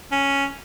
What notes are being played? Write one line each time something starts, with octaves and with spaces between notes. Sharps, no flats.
C#4